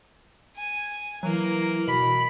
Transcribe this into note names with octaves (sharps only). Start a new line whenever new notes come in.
G#5
E3 F#3 A#3
B2 B5